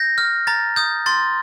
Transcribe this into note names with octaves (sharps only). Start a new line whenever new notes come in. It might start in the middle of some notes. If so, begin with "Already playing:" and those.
Already playing: G6 A#6
F6
A#5 A6
D#6 G6
C6 A6